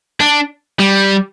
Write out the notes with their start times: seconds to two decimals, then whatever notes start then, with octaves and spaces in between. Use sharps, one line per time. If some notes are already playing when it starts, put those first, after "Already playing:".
0.21 D4
0.79 G3